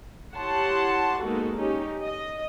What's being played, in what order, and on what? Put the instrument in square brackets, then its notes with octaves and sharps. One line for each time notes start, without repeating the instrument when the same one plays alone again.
[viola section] E4 G4 C#5 F#5 A5 C6
G#3 A#3 B3 D#4 F#4 A4
C#4 D#4 G4
D#5